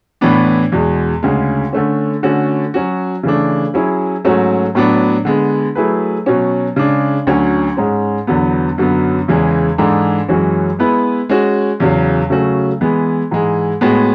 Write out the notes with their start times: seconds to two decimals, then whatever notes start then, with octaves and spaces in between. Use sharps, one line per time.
0.21 A2 E3 B3 D4
0.72 E2 B2 G#3
1.23 D2 C#3 G#3
1.73 D3 A3 C#4
2.23 D3 A3 C#4 F#4
2.74 F#3 C#4 F#4
3.23 C#3 E3 A3 D4
3.74 F#3 C#4 E4 G#4
4.25 G#2 F#3 A3 C#4 F#4
4.75 A2 F#3 B3 D4
5.25 D3 G#3 B3
5.75 F#3 A3 E4 G#4 B4
6.26 B2 F#3 C#4
6.76 C#3 G#3 D4
7.27 D2 D3 F#3 C#4
7.77 G#2 G#3 C#4
8.27 E2 D3 F#3 B3
8.78 F#2 D3 F#3 B3
9.28 E2 C#3 E3 G#3
9.78 G#2 E3 G#3 D4 A4
10.29 F#2 E3 G#3 C#4 F#4
10.79 G#3 B3 E4 B4
11.29 G#3 C#4 F#4
11.80 E2 C#3 F#3
12.30 C#3 F#3 A3 C#4 F#4
12.81 E3 G#3 B3
13.31 G#2 E3 G#3
13.81 A2 G#3 B3 F#4